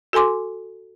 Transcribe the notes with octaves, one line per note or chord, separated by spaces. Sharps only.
F#4 A4 G#5 C6 D6